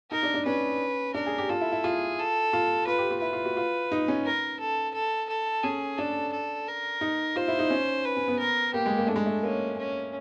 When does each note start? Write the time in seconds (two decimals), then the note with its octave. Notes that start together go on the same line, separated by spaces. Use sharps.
0.11 D#4 A#4
0.23 D4
0.34 D4
0.46 C#4 B4
1.14 D4 A#4
1.26 G#4
1.38 G4
1.49 F4 A4
1.61 E4
1.72 E4
1.84 F4 G#4
2.19 A4
2.53 F4
2.87 F4 B4
2.98 G4
3.11 F4
3.21 E4 B4
3.33 F4
3.45 F#4
3.57 F4
3.92 D#4
4.08 C#4
4.25 A#4
4.60 A4
4.94 A4
5.29 A4
5.63 C#4 G#4
5.97 D4 A4
6.32 A4
6.68 A#4
7.01 D#4
7.36 F4 C5
7.48 E4
7.59 D#4
7.70 C#4
8.05 B4
8.17 C#4
8.28 B3
8.39 A#4
8.74 A#3 G4
8.86 G#3
8.98 A#3
9.07 A3 D4
9.16 G#3
9.26 A3
9.43 A#3 C#4
9.78 C#4